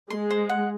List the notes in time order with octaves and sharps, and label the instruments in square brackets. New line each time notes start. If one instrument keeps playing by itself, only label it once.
[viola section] G#3 [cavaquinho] C6
[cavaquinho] C5
F#5